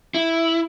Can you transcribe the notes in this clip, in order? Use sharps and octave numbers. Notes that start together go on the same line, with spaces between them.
E4